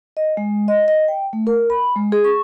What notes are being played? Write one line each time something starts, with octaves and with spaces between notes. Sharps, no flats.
D#5
G#3
D#5
D#5
G5
A3
A#4
B5
G#3
G#4
C#6